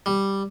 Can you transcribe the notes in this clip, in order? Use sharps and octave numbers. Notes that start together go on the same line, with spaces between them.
G3